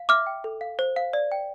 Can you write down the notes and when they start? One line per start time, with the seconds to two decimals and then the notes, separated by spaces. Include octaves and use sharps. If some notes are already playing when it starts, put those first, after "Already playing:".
Already playing: F5
0.09 E5 D6 F6
0.26 G5
0.44 A4
0.61 F5
0.79 C5
0.96 F5
1.13 D5
1.32 G5